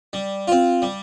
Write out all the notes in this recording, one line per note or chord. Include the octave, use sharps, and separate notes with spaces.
G3
C4 F4
G3